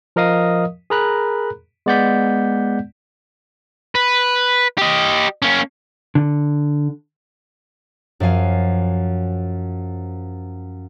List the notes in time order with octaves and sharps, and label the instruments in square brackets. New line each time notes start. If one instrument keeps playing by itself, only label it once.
[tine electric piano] F3 A#4 D#5 F5 D#6
G#4 A#4 A#5 B5 F#6
G#3 B3 D5 F#5 G6 B6
[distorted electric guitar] B4
G4 D#5
A#3 C#4
[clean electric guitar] D3
[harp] F#2 F3 F5 G#5